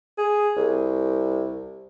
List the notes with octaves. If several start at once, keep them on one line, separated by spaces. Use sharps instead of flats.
G#4
C2